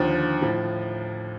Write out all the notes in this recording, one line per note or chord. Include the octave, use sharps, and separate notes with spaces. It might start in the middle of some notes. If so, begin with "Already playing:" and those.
Already playing: D#2 D3 F3
A2 F3